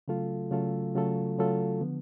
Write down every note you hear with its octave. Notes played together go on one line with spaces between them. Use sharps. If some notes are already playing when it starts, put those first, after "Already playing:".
C#3 F#3 A3 F4 A4
C#3 F#3 A3 F4 A4
C#3 F#3 A3 F4 A4
C#3 F#3 A3 F4 A4
D3 F3 B3